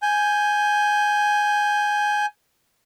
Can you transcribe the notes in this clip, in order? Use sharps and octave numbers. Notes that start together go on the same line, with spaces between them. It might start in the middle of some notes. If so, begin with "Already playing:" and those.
G#5 G6